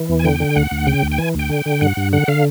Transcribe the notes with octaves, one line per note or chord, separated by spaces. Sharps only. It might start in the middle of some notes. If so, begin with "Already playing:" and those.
Already playing: E3
E2
G#5
D3 G5
D3
D2 F#5
D2
C#3 G5
D2
G5
E3 G#5
D2 G5
D3
D3
G2 F#5
G2
D3 F#5
D3 F5